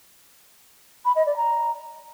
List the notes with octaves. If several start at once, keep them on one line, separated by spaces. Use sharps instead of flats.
B5
D#5
D5
A#5